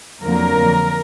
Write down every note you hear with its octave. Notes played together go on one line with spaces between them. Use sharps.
F2 D3 F#3 A#3 A#4